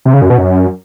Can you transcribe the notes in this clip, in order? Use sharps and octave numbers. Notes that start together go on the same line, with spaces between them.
C3
C#3
F#2
B2
F#2